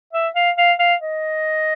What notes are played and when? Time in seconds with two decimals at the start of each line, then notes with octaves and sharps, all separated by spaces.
0.13 E5
0.36 F5
0.58 F5
0.79 F5
1.01 D#5